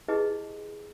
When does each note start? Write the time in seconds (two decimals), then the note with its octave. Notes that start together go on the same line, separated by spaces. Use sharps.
0.08 E4 G4 G#4 B4 D#5 A5